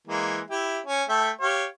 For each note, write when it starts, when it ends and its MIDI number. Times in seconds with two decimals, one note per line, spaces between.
0.07 0.40 52
0.07 0.40 56
0.07 0.40 58
0.50 0.80 64
0.50 0.80 67
0.50 0.80 76
0.86 1.03 61
1.09 1.30 57
1.09 1.30 76
1.09 1.30 79
1.41 1.66 67
1.41 1.66 73
1.41 1.66 77